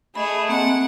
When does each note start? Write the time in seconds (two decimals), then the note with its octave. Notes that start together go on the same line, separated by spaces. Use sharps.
0.15 A3 G#4 D#5 B5
0.49 A#3 C4 F#5